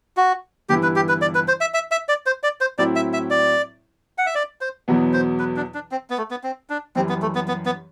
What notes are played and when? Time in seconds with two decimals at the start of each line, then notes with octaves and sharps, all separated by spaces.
0.17 F#4
0.69 G1 G2 E3 B3 E4 G4
0.83 B4
0.96 G4
1.08 B4
1.22 D5
1.35 B4
1.48 C5
1.61 E5
1.74 E5
1.91 E5
2.09 D5
2.26 C5
2.43 D5
2.61 C5
2.78 A2 F#3 C4 E4 D5
2.96 E5
3.13 E5
3.30 D5
4.18 F#5
4.26 E5
4.35 D5
4.61 C5
4.88 E2 B2 F#3 B3
5.13 C5
5.39 B4
5.56 D4
5.74 D4
5.91 C4
6.10 B3
6.18 A3
6.31 B3
6.43 C4
6.70 D4
6.95 F#2 E3 G3 C4
7.09 B3
7.22 A3
7.35 B3
7.48 B3
7.66 B3